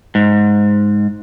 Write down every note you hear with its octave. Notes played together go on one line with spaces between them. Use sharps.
G#2